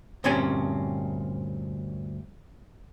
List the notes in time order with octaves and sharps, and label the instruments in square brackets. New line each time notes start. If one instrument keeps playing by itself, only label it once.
[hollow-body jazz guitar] D2 G2 A#2 C4 C#4 G#5